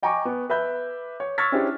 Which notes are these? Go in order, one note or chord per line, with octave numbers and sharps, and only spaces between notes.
D#5 G5 G#5 A#5 C#6 D6
B3
B4 E5 B5 G6
C#5
C#6 E6 F6 G#6 A6 B6
C#4 D4 E4 G4 G#4 C5